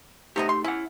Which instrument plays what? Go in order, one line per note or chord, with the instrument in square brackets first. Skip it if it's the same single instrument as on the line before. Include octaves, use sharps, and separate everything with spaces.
[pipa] C3 B3 D#5 [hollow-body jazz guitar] A3 D#4 G4
[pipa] C6
[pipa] C#4 [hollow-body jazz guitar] E4 F#5